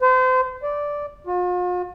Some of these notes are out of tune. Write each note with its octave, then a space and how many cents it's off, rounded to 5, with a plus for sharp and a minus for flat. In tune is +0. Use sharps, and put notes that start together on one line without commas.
C5 -35
D5 -5
F4 +45